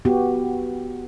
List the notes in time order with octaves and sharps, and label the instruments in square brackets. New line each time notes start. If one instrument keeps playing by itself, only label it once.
[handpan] B3 F#4 G4